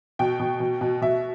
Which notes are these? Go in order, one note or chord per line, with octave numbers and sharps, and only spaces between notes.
B2 G5
B2
B2
B2
B2 E5